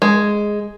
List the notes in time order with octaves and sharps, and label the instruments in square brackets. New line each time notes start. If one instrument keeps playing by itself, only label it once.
[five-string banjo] G#3